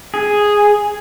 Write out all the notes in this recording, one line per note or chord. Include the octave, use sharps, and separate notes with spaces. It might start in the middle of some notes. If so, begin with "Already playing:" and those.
G#4